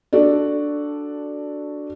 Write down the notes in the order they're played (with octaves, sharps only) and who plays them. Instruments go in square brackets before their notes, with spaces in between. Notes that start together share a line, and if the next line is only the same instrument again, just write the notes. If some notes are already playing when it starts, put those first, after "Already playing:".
[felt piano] D4 F#4 A4 D5